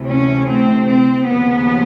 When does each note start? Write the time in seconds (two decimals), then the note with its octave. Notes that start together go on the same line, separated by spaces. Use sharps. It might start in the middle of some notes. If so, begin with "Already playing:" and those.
Already playing: D2 C3 E3 A3
0.09 C#4
0.48 C4
0.87 C4
1.26 D#2 C#3 F3 B3